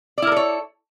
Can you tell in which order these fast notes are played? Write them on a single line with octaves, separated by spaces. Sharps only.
D5 E4 A#4 A4 C#5